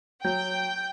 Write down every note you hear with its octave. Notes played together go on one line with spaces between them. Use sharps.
F#3 G5 G6